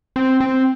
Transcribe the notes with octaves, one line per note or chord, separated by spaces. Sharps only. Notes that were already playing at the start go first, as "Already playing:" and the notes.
C4
C4